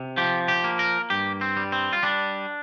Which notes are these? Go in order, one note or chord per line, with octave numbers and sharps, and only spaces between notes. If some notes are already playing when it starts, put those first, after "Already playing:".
Already playing: C3
F3 G4
G4
A#3
A#4
G2 G4
C4
G3
C4
F4
G3 D4